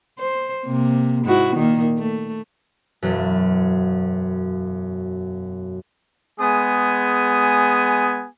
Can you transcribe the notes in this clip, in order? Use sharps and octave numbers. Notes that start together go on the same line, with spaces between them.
C5
C3 A#3
G#2 E4 F#4
A#2 D#3 A#3
A3
E1 F#2
G#3 B3 G#4 G#5 D#6